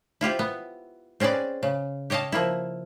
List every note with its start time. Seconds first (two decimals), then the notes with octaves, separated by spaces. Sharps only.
0.21 E4 F4 G4 C5
0.39 B3
1.20 C4 C#4 G#4 B4 D5
1.63 C#3
2.10 G4 C#5 D#5 F5 A5
2.32 F3 A#3 E4